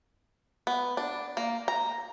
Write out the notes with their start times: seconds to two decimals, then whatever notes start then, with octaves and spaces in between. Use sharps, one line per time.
0.67 B3
0.97 D4
1.37 A#3
1.68 A#5